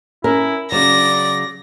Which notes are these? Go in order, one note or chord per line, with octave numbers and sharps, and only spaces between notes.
C#4 E4 A#4
C#3 F#3 D5 A#6